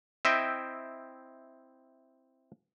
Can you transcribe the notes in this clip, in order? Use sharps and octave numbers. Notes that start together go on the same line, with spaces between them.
C4 E4 D#5 E5 G5